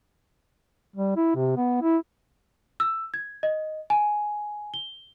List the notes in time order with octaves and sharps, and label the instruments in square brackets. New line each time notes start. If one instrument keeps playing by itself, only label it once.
[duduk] G3
E4
C3
B3
E4
[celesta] E6
G#6
D#5
G#5
G7